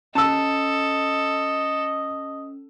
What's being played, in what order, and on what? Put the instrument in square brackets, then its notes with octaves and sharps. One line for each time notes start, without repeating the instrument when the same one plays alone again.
[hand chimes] C#4 [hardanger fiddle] A4 [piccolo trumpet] D#5 [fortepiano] A5 E6